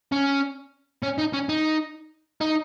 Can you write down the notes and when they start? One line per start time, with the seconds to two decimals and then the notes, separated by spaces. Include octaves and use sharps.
0.12 C#4
1.03 C#4
1.19 D#4
1.34 C#4
1.49 D#4
2.41 D#4